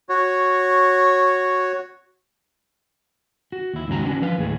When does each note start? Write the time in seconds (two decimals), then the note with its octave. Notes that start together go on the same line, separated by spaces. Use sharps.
0.09 F#4 C#5
3.52 F#4
3.74 D#2 E4
3.88 D#2 G#2 C#3 F#4 A#5
4.05 B3 C#4 D4 F#4
4.22 F3 B4 F5
4.38 D#2 A2 G#4